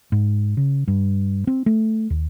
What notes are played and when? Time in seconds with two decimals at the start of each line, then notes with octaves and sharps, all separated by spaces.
0.12 G#2
0.57 C#3
0.88 G2
1.47 C4
1.66 A3
2.10 D#2